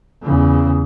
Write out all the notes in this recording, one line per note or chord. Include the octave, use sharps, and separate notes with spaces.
E2 C#3